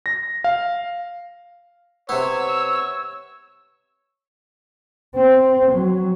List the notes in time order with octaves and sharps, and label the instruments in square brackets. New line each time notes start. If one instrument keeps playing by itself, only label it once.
[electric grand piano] A#6
F5
[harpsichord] C3 B3 [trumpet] C#5 [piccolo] E6
[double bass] C4
F#3